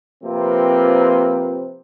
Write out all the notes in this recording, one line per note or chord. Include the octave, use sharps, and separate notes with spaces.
C3 F3 A#3 C4 B4